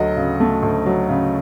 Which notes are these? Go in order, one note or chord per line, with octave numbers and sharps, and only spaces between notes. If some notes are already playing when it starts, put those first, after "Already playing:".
Already playing: D2 F#3 D#5
C#3
A3
D2
F#3
C#3